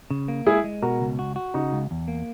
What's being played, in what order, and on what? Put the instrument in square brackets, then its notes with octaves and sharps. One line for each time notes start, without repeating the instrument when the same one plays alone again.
[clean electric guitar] C#3
A#3
[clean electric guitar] G#3 [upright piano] E4 G#4
[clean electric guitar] G#3
[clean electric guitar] B2 [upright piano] F#4 A#4
[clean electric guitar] C#2
F#4
F#4
[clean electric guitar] C#3 [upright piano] D#4 F#4
[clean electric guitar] C#2
E2
A#3